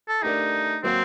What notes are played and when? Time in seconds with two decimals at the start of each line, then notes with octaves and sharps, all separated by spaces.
0.08 A4
0.23 A3 D4 D#4 G4 A#4 D5
0.83 F#3 A#3 C4 F#4 C5